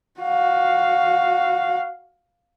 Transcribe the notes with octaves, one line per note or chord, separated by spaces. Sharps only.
F#4 F5